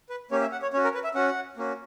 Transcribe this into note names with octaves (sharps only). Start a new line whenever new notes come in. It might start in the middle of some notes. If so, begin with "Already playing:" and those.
B4
A#3 C#4 G4 C#5
E5
F#5
C#5
C#4 F#4 C#5
A#4
B4
E5
C#4 F#4 F#5
A#3 C#4 F#4